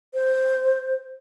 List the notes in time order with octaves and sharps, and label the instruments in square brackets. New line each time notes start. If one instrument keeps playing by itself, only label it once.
[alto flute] C5